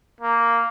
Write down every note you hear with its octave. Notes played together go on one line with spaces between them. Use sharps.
A#3